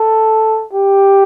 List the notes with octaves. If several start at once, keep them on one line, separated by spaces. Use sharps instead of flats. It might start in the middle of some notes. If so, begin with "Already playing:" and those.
Already playing: A4
G4